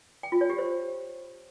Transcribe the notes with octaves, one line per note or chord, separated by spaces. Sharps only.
G5
F4
C#5
G4
C5